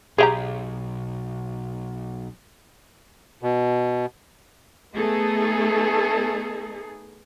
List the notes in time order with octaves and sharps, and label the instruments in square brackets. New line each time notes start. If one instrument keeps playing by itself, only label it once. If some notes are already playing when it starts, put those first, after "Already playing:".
[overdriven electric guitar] B1 [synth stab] G4 G#4 [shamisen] C#5 F5 A#5
[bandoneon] B2
[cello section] A3 B3 D#4 G#4 A4